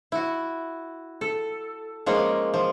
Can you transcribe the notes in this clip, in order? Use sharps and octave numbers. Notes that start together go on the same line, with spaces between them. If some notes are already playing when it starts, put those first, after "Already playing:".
E4 F#4
A4
F3 G#3 A#3 C#4
F3